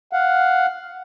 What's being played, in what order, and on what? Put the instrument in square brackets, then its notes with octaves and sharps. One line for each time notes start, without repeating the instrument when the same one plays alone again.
[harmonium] F5 F#5